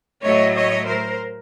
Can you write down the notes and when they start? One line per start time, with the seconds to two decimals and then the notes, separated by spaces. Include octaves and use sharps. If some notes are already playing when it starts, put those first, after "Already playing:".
0.23 A2 F#3 A3 C#5 D#5
0.55 C#5 D#5
0.86 A#4 C5